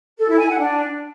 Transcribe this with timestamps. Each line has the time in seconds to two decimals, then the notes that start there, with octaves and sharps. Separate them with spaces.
0.18 A4
0.29 E4
0.39 G#5
0.49 F#5
0.59 D4